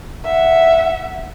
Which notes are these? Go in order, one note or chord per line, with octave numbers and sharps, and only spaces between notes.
E5 F#5